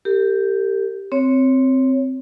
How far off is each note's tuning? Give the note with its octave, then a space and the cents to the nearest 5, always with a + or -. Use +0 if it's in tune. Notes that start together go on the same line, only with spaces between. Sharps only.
G4 +0 A#4 -45
C4 +0 C#5 +0